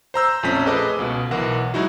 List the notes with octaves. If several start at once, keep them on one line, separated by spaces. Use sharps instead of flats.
C5 A#5 E6 G6
A#1 F2 A3 C#4 B6
G#4 A4 B4 C5 D#5 D6
C#2 B2
B1 E3 A#4 F#5
F#3 G#3 D#4 E4 F#4